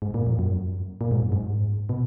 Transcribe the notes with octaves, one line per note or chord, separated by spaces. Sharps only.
G#2
A#2
F2
F#2
A#2
G#2
F#2
G#2
B2